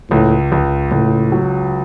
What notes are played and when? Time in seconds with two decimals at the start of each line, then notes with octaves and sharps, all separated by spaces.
0.11 C#2 A2
0.52 C#2
0.91 C#2 A2
1.32 F#3